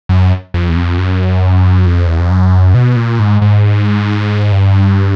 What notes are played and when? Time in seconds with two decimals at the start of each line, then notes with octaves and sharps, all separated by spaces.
0.09 F#2
0.54 F2
0.69 E2
0.76 F2
0.98 F#2
1.86 F2
2.07 E2
2.19 F2
2.30 F#2
2.74 B2
2.96 A#2
3.19 G#2
3.42 G#2
4.52 G2